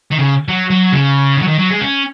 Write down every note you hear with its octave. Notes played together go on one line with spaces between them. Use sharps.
D#3
C#3
F#3
F#3
C#3
D#3
F#3
D#3
F#3
G#3
C#4